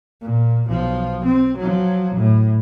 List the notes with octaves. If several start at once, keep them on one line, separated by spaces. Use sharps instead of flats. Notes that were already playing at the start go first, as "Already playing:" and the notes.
A#2
B1 F3
C4
F3 F#3
A2